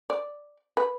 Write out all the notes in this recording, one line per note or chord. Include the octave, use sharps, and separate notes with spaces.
D5
B4